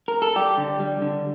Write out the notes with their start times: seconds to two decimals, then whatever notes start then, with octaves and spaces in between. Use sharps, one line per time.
0.08 A#4
0.22 A4
0.36 G3 G4
0.58 D3
0.80 G3
1.02 D3